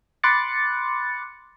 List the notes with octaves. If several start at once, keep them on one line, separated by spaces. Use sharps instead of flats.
B5 C6 D6 F#6 A6 C#7